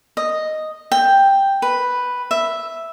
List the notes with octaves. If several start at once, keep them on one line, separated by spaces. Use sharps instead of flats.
D#5
G5
B4
E5